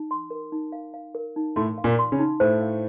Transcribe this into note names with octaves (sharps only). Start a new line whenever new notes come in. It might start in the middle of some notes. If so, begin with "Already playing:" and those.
Already playing: D#4
C6
A#4
D#4
F5
F5
A#4
D#4
A2 A3 C6
F5
A#2 A#3
C6
C#3 C#4
D#4
A2 A3 C5
F5